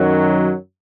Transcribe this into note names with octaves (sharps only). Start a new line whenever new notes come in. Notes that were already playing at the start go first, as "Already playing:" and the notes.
Already playing: F#2 D#3 F#3